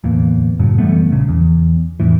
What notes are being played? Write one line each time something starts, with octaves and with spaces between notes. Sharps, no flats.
D1 E2 A#3
F#2 A2 C#3 F#3
E3 G3 A3 B3
A#1 C#3
E2
F2 A2 E3